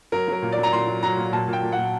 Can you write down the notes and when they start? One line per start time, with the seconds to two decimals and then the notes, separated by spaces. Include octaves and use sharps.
0.12 F#3 A#4
0.28 F#3
0.33 A#4
0.42 A#2
0.52 D5
0.58 F#3
0.63 A#5
0.73 A#2 C6
0.87 F#3
1.03 F#3 A#5
1.17 A#2
1.33 A#2 A5
1.48 A#2
1.53 G5
1.63 A#2
1.72 F#5
1.78 A#2